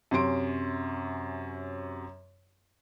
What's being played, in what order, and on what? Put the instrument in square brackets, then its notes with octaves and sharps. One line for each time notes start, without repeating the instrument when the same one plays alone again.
[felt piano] F#2 C3 C#4 C6 D7